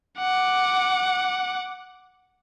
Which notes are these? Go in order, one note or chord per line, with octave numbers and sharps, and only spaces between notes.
F#5 D6